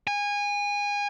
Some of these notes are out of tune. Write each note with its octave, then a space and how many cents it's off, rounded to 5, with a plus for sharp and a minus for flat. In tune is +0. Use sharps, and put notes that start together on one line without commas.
G#5 -25